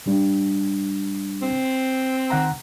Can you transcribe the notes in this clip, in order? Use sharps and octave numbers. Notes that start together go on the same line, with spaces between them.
A2 G3 D4
C4
D#3 F#5 A#5